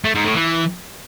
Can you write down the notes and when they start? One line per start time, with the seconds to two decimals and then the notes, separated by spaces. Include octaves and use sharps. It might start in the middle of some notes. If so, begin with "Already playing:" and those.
0.04 A3
0.15 G#2
0.25 A2
0.35 E3